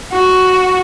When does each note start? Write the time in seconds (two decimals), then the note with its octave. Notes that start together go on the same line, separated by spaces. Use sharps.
0.12 F#4